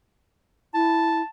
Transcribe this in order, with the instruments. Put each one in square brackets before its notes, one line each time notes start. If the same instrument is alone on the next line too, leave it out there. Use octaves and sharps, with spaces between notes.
[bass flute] E4 [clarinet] A5